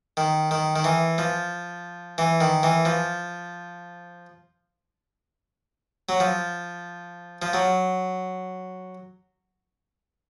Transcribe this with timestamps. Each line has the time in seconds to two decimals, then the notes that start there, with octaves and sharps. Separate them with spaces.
0.17 D#3
0.51 D#3
0.76 D#3
0.84 E3
1.18 F3
2.18 E3
2.41 D#3
2.63 E3
2.85 F3
6.09 F#3
6.20 F3
7.42 F3
7.53 F#3